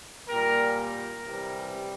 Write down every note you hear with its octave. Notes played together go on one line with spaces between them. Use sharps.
A#2 G3 A#4
A#4
C3 E3 G3